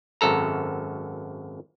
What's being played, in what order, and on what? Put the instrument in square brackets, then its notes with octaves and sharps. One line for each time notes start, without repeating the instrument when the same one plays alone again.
[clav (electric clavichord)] G#1 F#2 A4 A#5